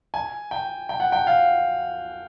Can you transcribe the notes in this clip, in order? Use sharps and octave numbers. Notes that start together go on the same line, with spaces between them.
G#5
G5
G5
F#5
G5
F5